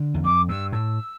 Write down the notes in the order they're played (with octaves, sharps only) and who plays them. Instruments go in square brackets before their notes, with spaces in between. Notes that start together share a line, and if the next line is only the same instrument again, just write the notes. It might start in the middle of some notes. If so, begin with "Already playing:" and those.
Already playing: [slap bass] D3
E2
[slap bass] F2 [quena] D6
[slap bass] G2 [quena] E6
[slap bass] A2 [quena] E6